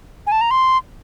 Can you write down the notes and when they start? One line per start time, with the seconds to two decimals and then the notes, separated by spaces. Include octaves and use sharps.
0.27 G#5
0.32 A5
0.41 A#5
0.51 C6